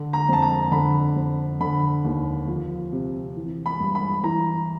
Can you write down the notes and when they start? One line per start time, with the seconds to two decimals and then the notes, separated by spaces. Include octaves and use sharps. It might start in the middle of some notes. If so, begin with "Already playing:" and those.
Already playing: D3
0.13 A#5
0.29 F2 A5
0.42 A#5
0.72 D3 B5
1.16 F2
1.60 D3 B5
2.04 D#2
2.47 F3
2.92 C3
3.36 E3
3.66 B5
3.80 G2
3.95 B5
4.23 E3 A#5